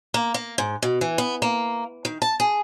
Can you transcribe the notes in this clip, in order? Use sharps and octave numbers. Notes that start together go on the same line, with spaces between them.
A#3
A#3
G#2
B2
E3
B3
A#3
D#3
A5
G#4